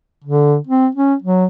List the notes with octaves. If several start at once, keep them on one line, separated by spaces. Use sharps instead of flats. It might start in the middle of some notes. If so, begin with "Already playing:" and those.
D3
C4
C#4
F#3